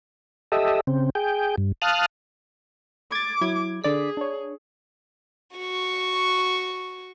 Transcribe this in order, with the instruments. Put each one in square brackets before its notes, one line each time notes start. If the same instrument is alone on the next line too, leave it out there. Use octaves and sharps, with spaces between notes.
[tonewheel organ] G4 A4 D#5 E5
C#3 C4
G#4 G5
G2
F5 A5 D#6 F6 F#6
[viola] D6 [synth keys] G#6 A6
[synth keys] F#3 E4 G#6
[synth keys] D3 D5 B6 [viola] G#4
[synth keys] D4 C#5
[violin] F#4 C#6